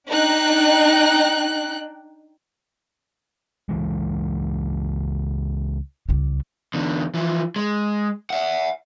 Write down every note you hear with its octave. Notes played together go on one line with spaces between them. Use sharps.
D4 D#4 G5 F#6
C#2 E3 G#3
C#2 G3
E2 D3
E3 F3
G#3
E5 F#5